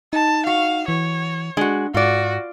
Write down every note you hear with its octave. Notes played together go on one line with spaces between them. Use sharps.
D#4 A5
F#4 F5
E3 C#5
G#3 D4 F#4
G#2 F4 F#4 D5